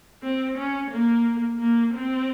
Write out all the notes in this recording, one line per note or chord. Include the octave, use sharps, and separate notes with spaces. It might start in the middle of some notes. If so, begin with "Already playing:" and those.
C4
C#4
A#3
A#3
C4